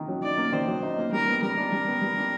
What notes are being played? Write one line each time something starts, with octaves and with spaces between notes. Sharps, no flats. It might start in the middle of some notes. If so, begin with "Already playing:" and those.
Already playing: D#3 A#3 D#4
F#3
D#4 D5
A#3
D#3 C5
F#3
D#4
A#3
G3 A#4
B3
G3 A#4
D4
G3
B3
G3
D4